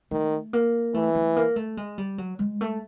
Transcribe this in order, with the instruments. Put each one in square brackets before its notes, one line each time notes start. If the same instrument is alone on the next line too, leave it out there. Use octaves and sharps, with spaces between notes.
[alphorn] D#3 [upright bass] A3
[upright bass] A#3
[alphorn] E3 [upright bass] A3
[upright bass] A3
A#3
A3
G#3
G3
F#3
G#3
A3